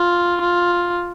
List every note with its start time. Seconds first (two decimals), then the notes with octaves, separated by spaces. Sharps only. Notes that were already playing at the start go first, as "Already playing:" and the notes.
Already playing: F4
0.41 F4